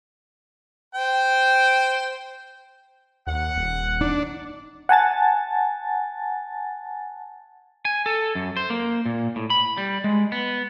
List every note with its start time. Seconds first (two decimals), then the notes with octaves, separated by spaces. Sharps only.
0.95 C5 G5
3.27 D#2 F#5
3.57 D#1
4.01 D4 D#4
4.89 F#5 G#5 A5 A6
7.85 G#5
8.06 A4
8.35 F#2
8.57 C5
8.70 A#3
9.06 A#2
9.36 A2
9.50 B5
9.78 G3
10.04 G#3
10.32 B3